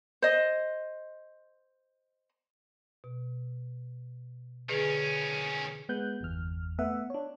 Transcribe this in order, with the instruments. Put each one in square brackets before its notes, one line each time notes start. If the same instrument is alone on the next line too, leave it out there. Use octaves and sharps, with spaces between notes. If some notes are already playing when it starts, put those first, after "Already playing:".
[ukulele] C5 D#5
[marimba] B2
[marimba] D3 G#4 B4 [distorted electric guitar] D#3 C#4
[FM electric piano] G#3 B3 F#6 G6
G1 E2 F6
A3 B3 E5 F#5
D4 C#5